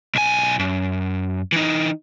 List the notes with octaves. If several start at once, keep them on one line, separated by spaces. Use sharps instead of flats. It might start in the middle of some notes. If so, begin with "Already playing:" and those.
B1 G#5
F#2
E3 D#4